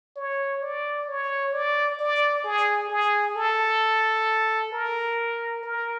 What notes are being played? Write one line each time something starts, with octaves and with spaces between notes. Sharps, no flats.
C#5
D5
C#5
D5
D5
G#4
G#4
A4
A#4
A#4